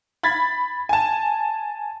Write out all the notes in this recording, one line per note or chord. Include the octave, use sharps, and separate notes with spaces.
B5 G#6 A6 B6
G#5 A5